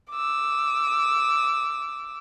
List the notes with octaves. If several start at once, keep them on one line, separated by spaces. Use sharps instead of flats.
D6 E6